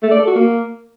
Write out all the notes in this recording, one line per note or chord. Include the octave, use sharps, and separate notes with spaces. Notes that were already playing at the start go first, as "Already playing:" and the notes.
A3
D5
A4
F#4
A#3